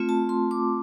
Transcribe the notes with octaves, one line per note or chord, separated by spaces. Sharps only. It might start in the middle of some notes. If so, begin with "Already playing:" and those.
Already playing: A3 C4 F4
A5
C6
D6